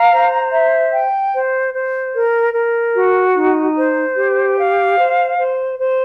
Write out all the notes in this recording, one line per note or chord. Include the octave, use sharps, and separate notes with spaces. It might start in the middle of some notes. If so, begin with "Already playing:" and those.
Already playing: F5 A#5
C5
E5
G5
C5
C5
A#4
A#4
F#4
D#4
C5
G4
F5
C5
C5
C5